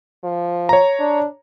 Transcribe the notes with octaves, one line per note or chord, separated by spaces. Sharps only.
F3
C#5 A#5
D4